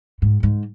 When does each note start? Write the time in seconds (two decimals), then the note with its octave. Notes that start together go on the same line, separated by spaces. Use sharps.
0.22 G#2
0.43 G#2